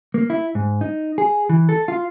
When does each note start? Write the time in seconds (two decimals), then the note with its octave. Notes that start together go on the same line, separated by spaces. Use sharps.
0.14 A#3
0.30 E4
0.55 G#2
0.81 D#4
1.18 G#4
1.49 E3
1.69 A4
1.88 F4